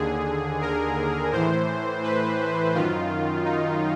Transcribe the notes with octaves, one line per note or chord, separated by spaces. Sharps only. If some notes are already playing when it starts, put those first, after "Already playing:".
Already playing: D#2 D3 G#4
A#4
A2 E3 C5
B4
F#2 D#3 F4
D#4